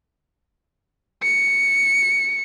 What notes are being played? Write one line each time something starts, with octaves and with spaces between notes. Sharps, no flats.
C#7